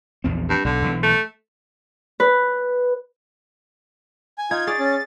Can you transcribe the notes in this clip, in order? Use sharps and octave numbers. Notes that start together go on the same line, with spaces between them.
A#1 E2 C4
G2
B1 D3
B1 E3
A3
B4
G#5
D#4 F4 G#6
G#4 C#5 D5 A6
C#4